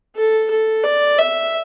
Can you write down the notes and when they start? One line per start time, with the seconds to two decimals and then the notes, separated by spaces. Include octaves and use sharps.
0.16 A4
0.50 A4
0.84 D5
1.18 E5